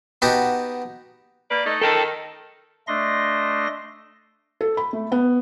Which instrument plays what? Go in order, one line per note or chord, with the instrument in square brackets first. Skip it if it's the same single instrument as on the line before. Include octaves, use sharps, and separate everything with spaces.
[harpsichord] B3 D#4 F#4 G4 A5
[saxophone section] A#3 B4 D5
A3 D#4
[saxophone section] D#3 [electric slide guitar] A4 G5 A5
[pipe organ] A3 D4 D#5 C6 A#6
[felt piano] A4
B5
A3
B3